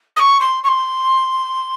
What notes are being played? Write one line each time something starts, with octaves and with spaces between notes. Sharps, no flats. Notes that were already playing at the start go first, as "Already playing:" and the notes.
D#6
C#6
C6
C#6
C6